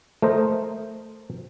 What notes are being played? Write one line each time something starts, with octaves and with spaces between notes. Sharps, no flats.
A3 A#4 C5 D#5